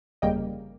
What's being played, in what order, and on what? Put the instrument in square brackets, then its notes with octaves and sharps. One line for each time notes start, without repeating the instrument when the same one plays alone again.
[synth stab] G1 F2 C#3 G3 A#3 D#5 G5